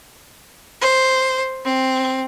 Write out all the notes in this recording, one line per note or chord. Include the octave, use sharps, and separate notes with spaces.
C5
C4